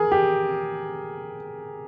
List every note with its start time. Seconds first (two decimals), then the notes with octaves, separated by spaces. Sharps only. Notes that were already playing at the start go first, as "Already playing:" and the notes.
Already playing: G#4 A#4
0.12 G4